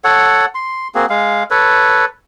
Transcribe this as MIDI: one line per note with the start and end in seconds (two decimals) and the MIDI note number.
0.04 0.46 69
0.04 0.46 73
0.04 0.46 78
0.55 0.88 84
0.95 1.06 58
0.95 1.06 60
0.95 1.06 66
0.95 1.06 68
1.10 1.43 56
1.10 1.43 77
1.50 2.05 69
1.50 2.05 71
1.50 2.05 73